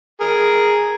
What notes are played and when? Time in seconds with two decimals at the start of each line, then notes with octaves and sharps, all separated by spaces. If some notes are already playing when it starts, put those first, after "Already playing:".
0.21 G#4 A#4